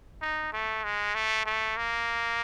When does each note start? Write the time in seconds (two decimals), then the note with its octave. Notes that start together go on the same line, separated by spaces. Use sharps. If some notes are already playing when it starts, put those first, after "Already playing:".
0.22 D#4
0.53 A3
0.84 G#3
1.15 A3
1.46 A3
1.77 A#3